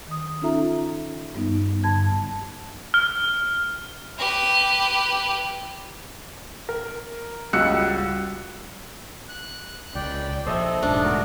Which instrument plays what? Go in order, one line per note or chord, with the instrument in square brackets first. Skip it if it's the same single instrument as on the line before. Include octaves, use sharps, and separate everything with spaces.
[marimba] D#3 D#6
C#4 D#4 F4 A4 E5 A#5
G2 G3 B3 D#4
G2 D3 A5 G#6
[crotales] F6
[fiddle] G4 B4
[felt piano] A#4
C#2 G3 F#4 E6 F#6 C#7
[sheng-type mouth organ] F#6
[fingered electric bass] C#2 [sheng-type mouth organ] D5 G5
[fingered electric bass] A#1 [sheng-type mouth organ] A4 D#5 [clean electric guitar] C5 E5
[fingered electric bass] E1 G#2 [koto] D4
[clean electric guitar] D3 G#3 A3 [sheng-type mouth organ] F#4 A#4